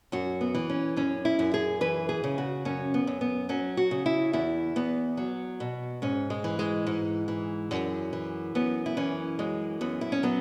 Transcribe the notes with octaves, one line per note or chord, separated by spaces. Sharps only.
F#2 F#4
B3
E3
C#4
F#2 C#4
E4
F#2
G#4
E3 B4
G#4
C#3
F#4
F#2 C#4
B3
F#2
B3
F#3 C#4
F#4
C#3
E4
E2 E4
E2 B3
F#3
B2
G#2 C#4
G#3
E3
G#3
G#2
E3
F#2
E3
F#2 B3
E4
E3 C#4
F#2 G#3
F#2 B3
E4
C#4
F#3 B3